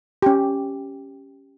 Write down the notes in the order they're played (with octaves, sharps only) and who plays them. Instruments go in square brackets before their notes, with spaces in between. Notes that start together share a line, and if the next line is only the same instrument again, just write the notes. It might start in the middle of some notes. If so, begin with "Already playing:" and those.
[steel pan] C#4 G4